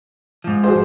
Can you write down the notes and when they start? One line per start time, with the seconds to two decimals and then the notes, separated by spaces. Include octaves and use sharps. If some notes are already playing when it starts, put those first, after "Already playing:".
0.44 G#2 F3
0.64 F#4 G#4 C5